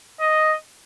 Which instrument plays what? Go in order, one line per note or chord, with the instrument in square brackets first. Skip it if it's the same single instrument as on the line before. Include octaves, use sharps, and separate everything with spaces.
[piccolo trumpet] D#5